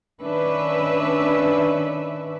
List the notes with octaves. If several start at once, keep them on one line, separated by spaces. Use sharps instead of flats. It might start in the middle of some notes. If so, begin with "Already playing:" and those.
D#3 C#4 D4 B4 E5